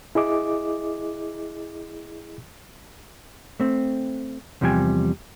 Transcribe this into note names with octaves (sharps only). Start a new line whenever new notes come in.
E4 G#4 D#5 D6
A3 C4
E2 C3 F3 G3 G5 G#5